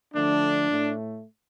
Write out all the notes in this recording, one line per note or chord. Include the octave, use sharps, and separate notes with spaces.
D3 F3 A3 D4
A2 A3